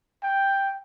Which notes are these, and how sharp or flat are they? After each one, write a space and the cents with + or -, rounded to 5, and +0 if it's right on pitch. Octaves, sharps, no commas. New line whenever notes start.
G5 +5